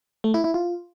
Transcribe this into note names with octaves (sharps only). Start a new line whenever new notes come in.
A3
E4
E4
F4